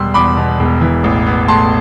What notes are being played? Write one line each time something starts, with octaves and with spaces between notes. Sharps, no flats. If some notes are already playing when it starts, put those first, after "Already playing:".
Already playing: E1 B2 G3 C6 E6
E2 B5 D6
B2
E1
E3
A1
B3
A2 A5 C6